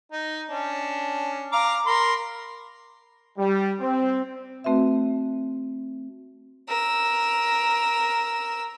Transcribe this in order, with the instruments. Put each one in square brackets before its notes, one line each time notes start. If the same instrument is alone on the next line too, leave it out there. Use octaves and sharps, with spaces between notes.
[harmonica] D#4
C#4 D4
F5 A#5 D6
A#4 B5 C6
[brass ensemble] G3
C4
[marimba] A3 C4 F#4 B4 E5
[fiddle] A#4 E6